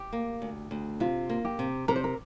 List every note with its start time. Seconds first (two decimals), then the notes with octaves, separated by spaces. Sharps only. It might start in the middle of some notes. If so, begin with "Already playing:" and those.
Already playing: G4
0.13 A#3
0.42 D2
0.71 D2
1.00 C3 F4
1.29 A#3
1.45 G4
1.59 C3
1.88 C3 A#4
1.96 C5
2.04 A#4